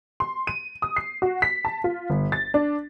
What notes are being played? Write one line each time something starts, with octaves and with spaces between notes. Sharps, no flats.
C6
D#7
D#6
C7
F#4
B6
A5
F4
G1
A6
D4